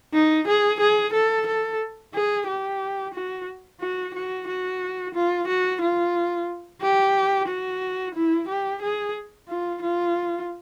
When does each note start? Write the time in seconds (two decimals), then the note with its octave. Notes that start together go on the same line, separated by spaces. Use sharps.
0.13 D#4
0.47 G#4
0.80 G#4
1.13 A4
1.46 A4
2.14 G#4
2.47 G4
3.14 F#4
3.80 F#4
4.14 F#4
4.47 F#4
5.14 F4
5.48 F#4
5.81 F4
6.82 G4
7.48 F#4
8.15 E4
8.48 G4
8.82 G#4
9.48 F4
9.82 F4